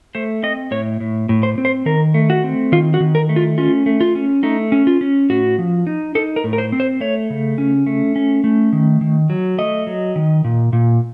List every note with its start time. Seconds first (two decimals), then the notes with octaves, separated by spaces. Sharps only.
0.15 A3 C5
0.43 C4 D#5
0.71 A2 C#5
1.00 A2
1.29 A2
1.43 C5
1.58 C4
1.65 C5
1.86 D#3 A#4
2.14 A3
2.30 F#4
2.44 C4
2.72 D#3 F4
2.94 F#4
3.00 D#3
3.15 A#4
3.29 A3
3.36 F4
3.58 C#4 F4
3.86 A3
4.01 F4
4.15 C#4
4.43 A3 D#4
4.72 C#4
4.87 F4
5.01 C#4
5.30 A2 F#4
5.58 F3
5.87 D#4
6.15 D#4 A4
6.36 A#4
6.44 A2
6.53 A#4
6.58 C5
6.72 C4
6.80 C5
7.00 A3 C#5
7.30 C#3
7.58 C#4
7.87 A3
8.16 C#4
8.44 A3
8.73 D#3
9.01 D#3
9.30 F#3
9.58 A3 D#5
9.87 F#3
10.16 D#3
10.44 A#2
10.73 A#2